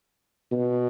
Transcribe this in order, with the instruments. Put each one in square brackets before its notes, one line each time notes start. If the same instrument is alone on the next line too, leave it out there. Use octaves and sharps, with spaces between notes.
[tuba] B2